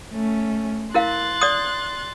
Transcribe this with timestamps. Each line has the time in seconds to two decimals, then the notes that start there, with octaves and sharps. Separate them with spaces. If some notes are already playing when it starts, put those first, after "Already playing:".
0.12 A3 C#4
0.94 E4 A#4 F5 C6 F#6 A6
1.41 D5 D#6